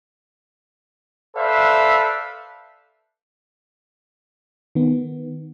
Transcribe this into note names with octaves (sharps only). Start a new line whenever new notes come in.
A4 B4 C5 D5 E5 F5
D#3 B3